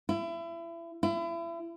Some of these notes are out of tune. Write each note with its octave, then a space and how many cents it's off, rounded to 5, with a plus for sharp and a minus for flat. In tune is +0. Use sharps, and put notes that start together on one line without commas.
E4 +30
E4 +35